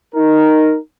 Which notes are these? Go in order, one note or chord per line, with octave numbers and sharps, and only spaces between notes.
D#4 A#4